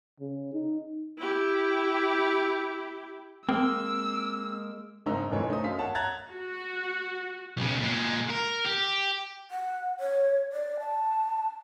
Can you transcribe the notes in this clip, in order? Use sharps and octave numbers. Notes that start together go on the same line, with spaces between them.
C#3
D#4
E4 G4
G#3 A#3 C4 E6
F#1 G#2 C4 D#4 A#5 E6
F1 F2 E3 D#4 C#5
A3 D#4 C5 D#6
F#2 F5 B6
C#5 F#5 A5
A#5 F#6 G#6 A6
F#4
B1 C#3
A#2 G#3
A#4
G4
F#5
C#5
D5
A5